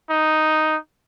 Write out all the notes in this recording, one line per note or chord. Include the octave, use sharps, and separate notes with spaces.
D#4